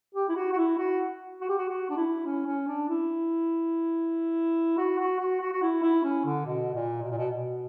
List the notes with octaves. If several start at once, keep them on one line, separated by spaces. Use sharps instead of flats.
G4
E4
F#4
F#4
E4
F#4
F#4
G4
F#4
F#4
D4
E4
C#4
C#4
D4
E4
F#4
F#4
F#4
F#4
F#4
E4
E4
C#4
D3
B2
A#2
B2
A#2
B2
B2